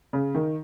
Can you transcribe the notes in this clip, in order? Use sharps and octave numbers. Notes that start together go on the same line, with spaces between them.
C#3
D#3